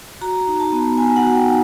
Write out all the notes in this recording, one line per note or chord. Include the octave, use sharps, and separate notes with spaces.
F#4 A#5
D#4
A5
B3
B3 G#5
F#5
F#4
G5
D#4